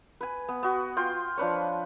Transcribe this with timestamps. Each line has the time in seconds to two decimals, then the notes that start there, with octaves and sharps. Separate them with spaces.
0.21 B4 G#5
0.48 B3
0.63 B3 F#4
0.97 F4 G5 C6
1.37 F3 D4 B4 C#5